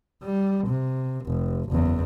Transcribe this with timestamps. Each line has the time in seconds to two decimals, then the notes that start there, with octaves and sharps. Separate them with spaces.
0.23 G3
0.67 C3
1.25 F1
1.69 F#1 E2